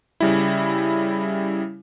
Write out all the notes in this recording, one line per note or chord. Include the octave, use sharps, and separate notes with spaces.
C#3 G3 E4